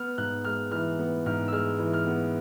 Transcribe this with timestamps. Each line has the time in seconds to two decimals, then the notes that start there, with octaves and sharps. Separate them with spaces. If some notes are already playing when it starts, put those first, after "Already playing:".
Already playing: B3 F6
0.18 G#2 F#6
0.45 G#3 F6
0.71 E3 F6
0.99 B3
1.26 G#2 F6
1.48 E6
1.52 G#3 F6
1.79 E3
1.93 F6
2.07 B3